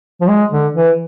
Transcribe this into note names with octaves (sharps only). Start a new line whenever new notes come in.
F3
G#3
D3
E3